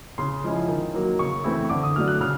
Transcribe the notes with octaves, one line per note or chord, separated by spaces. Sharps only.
C#3 C6
F3 G#3 C#4 E4
D#3
F#3 A#3
C#3 C#6
E3 A3 C4 E4
C#6
D3 D6
D#6
F#3 A3 D4 F6
F#6
C#3 F6